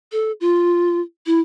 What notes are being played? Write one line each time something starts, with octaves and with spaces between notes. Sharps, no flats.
A4
F4
E4